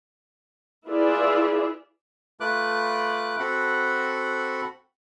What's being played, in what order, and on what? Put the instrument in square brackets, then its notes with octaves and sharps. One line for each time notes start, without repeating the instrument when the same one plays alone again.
[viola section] E4 F4 G#4 B4 D5 E5
[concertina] A3 F4 B4 D6 F#6
C4 F#4 A4 F#5 B5